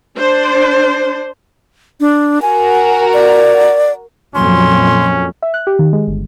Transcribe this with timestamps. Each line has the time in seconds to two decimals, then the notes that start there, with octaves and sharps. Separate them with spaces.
0.18 D4 C5
2.00 D4
2.42 F#4 A#4 G#5
3.13 D5
4.35 F2 A#2 F#3 C#4 C6
5.42 E5
5.54 F#6
5.67 G4
5.79 D#3
5.93 G#3
6.07 G1